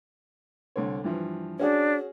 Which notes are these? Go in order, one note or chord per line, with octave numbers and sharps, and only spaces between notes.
C2 D3 C#5
G2 E3 F3
C#4 D4 F#4 G#4